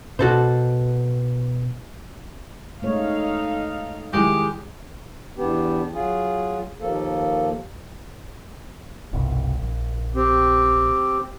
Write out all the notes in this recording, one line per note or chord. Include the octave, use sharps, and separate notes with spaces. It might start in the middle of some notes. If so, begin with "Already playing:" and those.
B2 F#4 A4 C5
G#3 A3 D#4 A4 C#5 F5
D#3 G#3 E4 G4 G#4
E2 B3 D4 G4
F#3 F4 G#4
D#2 F3 A#3 A4
G1 C2 B2
A#1
C4 G4